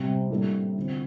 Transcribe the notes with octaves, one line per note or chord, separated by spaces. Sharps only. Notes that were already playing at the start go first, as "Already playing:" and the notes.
Already playing: C3 G3 C4
A2 G3 A#3 D4 A4
D3 F3 C4